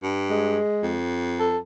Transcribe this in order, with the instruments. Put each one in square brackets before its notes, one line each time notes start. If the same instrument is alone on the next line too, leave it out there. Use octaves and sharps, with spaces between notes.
[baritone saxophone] G2
[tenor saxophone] G#3
[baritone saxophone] F2
[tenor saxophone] A4